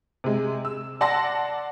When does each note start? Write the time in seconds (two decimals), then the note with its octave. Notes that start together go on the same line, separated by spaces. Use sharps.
0.24 C3 G#3
0.65 E6
1.01 D5 F#5 A5 C6 E6 A#6